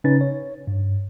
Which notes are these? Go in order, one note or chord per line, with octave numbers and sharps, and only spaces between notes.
C#3 C#4 D#4 B4 A6
C#5
G2